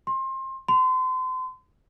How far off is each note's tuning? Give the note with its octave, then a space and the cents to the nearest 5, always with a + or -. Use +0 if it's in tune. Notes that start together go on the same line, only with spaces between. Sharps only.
C6 +25
C6 -35